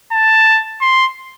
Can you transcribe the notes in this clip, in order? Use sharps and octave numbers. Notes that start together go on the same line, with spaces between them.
A5
C6